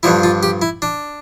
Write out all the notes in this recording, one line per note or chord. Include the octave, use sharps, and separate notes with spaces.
G2 D3 F3 E4
F4
G4
E4
D4